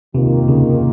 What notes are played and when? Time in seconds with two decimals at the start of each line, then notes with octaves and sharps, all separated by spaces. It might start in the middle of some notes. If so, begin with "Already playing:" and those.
0.14 C3 D#3 A#3 F4
0.48 C#3